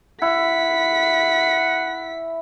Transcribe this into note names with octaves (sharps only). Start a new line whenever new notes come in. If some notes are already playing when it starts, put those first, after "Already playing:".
E4 F#5 B6